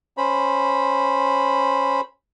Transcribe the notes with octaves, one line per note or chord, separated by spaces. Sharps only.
C#4 C5 B5